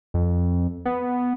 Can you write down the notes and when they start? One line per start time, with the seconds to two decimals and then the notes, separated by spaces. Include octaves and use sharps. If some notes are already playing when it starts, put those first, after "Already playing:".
0.14 F2
0.85 B3